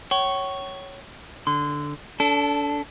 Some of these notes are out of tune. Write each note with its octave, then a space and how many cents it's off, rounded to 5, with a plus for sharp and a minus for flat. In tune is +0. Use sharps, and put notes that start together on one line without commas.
C#5 +0 G5 -45
D3 +0 C6 -25
D4 -35 A4 +0